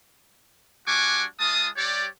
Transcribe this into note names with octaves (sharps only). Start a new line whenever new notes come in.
G3 D4 F#4 G#5 C#6 D6
G#3 F4 D#5 A5 D#6
G3 G4 C#5 D5